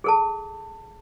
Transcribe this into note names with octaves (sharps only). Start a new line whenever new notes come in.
G#4 A4 A5